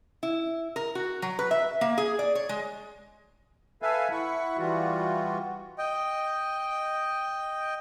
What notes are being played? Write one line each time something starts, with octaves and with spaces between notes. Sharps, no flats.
E4
A#4
F#4
F#3
B4
E5
A#3
G#4
D5
C#5
G#3
A4 B4 E5 F5 G#5
E4 F#5 B5 C#6
E3 G3 F4 F#4
D#5 G5